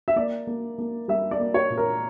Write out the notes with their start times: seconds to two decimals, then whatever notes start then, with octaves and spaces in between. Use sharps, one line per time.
0.08 E5
0.16 A#3 D5
0.47 A#3
0.78 A#3
1.08 G3 E5
1.31 D5
1.40 A#3
1.54 C#5
1.70 A#2
1.77 A#4